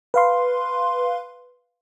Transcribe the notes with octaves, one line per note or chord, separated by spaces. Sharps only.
B4 F5 C6